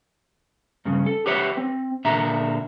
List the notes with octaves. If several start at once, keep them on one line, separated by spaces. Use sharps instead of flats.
G2 C#3
A4
G4 B4 C#5 E5 F#5
C4
A#2 D3 E5 A#5